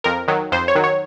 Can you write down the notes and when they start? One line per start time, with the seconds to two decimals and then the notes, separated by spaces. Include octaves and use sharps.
0.04 F2 A#4
0.28 D#3 F#3
0.52 F2 C5
0.68 C#5
0.75 D#3 F#3
0.84 C#5